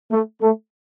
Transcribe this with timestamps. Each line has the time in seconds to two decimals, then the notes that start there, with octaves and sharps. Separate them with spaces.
0.11 A3
0.42 A3